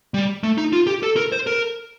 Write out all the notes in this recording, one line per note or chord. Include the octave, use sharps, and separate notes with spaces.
G3
A3
D#4
F4
G4
A4
A#4
C5
A#4